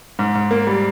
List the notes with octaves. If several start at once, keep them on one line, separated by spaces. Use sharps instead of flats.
G#2
G#2
A#3
G3